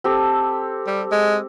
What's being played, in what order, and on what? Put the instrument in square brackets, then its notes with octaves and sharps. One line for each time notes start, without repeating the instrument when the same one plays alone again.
[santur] C4 G4 A4
[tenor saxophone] G3
G#3